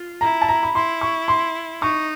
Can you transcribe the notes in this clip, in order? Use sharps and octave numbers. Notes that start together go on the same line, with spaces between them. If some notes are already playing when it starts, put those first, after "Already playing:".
Already playing: F4
E4 A#5
A5
A#5
B5
E4 C6
C#6
C6
D#4 C#6